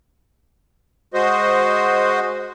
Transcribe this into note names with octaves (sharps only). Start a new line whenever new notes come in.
G#3 F#4 C5 D#5